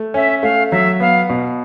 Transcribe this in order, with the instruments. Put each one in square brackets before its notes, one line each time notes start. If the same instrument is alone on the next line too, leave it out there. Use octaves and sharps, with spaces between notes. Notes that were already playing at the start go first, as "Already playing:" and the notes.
Already playing: [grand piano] A3
[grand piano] C#4 [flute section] E5
[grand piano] A3 [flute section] F5
[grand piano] F#3 [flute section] E5
[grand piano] B3 [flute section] F5
[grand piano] B2